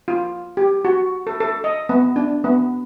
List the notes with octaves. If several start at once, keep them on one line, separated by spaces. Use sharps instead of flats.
F4
G4
F#4
A4
A4
D#5
B3
D4
B3